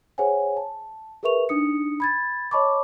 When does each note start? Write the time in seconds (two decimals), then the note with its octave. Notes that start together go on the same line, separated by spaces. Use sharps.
0.18 G#4 C5 C#5 F#5 G#5
0.57 A5
1.23 G#4 A#4 B4 E5 C#6 F7
1.49 D4 D#4 D#6 C#7
2.00 B5 G#6 A6
2.51 C#5 D#5 A5 B5 C#6 D6